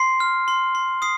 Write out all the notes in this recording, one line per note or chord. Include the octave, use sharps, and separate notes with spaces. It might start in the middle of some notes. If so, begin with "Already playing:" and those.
Already playing: C6 C7
F6
C6
C6
D#6 C7